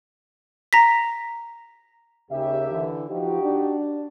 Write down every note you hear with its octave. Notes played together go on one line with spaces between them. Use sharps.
A#5 A#6 B6
D#2 C#3 G4 E5
D3 E3
F3 D#4 F#4 G4
D4